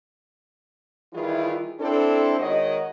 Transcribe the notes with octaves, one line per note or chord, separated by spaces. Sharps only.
D#3 E3 G3 E4 F4 G#4
C4 D4 E4 A4
D#3 G#3 F#4 C#5 D#5